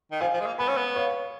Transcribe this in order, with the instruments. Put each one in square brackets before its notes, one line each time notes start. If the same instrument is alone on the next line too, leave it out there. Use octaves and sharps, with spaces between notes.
[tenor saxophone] D#3
[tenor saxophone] F3 [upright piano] F5 G#5
[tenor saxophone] F3
G#3
A#3
[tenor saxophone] B3 [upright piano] G#5 B5
[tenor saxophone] C#4
B3
[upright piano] C#5 F5